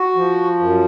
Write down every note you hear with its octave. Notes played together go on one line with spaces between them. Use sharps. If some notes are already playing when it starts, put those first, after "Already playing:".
Already playing: F#4
F3
F#2